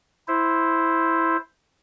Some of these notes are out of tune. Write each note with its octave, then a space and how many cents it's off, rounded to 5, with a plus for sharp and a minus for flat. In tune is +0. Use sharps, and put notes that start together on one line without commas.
E4 +0 C5 +0